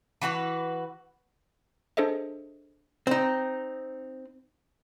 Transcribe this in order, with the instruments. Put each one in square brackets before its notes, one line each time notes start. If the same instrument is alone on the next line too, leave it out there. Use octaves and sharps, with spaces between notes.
[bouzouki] E3 F#4 G4 B4
[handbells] D4 G#4 A4 C5 D#5 E5
[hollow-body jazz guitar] C4 D#4